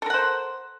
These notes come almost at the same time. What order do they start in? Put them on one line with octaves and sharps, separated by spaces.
A4 A#4 F#5 C5